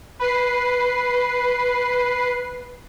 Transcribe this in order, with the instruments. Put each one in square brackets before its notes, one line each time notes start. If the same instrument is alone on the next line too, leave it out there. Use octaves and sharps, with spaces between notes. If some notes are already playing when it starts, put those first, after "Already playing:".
[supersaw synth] B4 C7